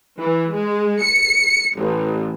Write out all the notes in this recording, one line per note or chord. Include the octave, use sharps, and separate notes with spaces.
E3
G#3
C#7
A1